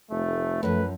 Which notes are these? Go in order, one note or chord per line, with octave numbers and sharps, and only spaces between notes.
F1 A3
F#2 F3 A3 B4